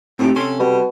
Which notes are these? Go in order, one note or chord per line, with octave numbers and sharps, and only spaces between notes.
A2 C4 D#4 G4
C3 C#4 A4 C6
B2 G3